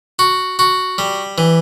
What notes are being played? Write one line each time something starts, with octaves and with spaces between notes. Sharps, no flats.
F#4
F#4
G3
E3